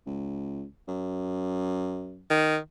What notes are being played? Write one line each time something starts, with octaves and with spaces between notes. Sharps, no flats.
C#2
F#2
D#3